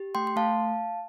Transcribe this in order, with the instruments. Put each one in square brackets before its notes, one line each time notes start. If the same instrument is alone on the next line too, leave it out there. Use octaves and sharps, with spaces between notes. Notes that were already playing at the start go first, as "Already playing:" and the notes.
Already playing: [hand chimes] G4
A3 G5 C6
C6
A3 F5 A5